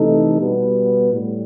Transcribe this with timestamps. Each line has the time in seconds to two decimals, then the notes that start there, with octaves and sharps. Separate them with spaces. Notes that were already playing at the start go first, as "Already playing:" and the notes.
Already playing: C3 E3 A3 D#4 A4
0.40 B2 G3 B3
1.12 A2 G3